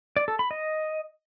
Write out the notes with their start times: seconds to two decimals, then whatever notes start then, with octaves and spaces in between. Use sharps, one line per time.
0.17 D5
0.28 A4
0.39 B5
0.51 D#5